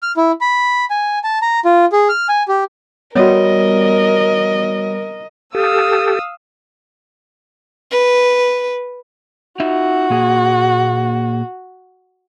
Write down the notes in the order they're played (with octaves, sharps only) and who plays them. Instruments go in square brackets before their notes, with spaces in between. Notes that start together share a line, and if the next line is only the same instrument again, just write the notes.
[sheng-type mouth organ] F6
E4
B5
G#5
A5
A#5
F4
G#4
F6
G#5
G4
[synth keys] G3 B3 [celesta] F#4 C#5 [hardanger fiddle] A#4 [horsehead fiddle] D#5
[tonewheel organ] G4 A4 [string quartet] F5 D#6 E6
[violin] B4
[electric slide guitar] D#4 F4 E5 [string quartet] F#4
[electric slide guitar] A#2 A#3 G#4